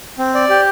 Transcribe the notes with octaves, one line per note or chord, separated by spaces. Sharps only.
C4
D5
G4